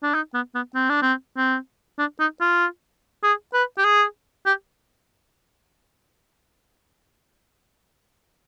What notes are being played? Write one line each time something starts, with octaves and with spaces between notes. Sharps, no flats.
D4
D#4
B3
B3
C4
D4
C4
C4
D4
D#4
F4
G#4
B4
G4
G#4
G4